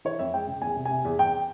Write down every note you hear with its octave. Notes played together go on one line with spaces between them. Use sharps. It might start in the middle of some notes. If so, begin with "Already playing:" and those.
E3 C#5
F2 E5
G#3 G5
C#3
E2 G#5
C3
G#5
C3
E2
E2 G5